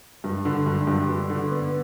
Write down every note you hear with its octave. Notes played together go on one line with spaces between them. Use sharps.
G2
D3
G2
G2
G2
D3
B3